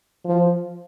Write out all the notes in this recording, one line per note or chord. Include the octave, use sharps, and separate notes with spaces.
F3